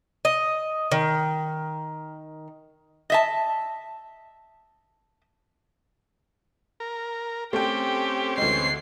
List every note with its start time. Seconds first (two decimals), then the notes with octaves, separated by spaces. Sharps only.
0.25 D#5
0.92 D#3
3.10 D#5 E5 A5
6.80 A#4
7.53 A3 C4 C#4 G4 G5
8.38 D2 E3 G#3 C7